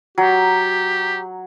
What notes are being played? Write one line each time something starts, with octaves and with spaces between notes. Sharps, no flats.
F#3 G4